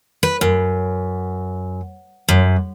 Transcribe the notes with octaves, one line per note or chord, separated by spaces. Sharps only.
B4
F#2
F#2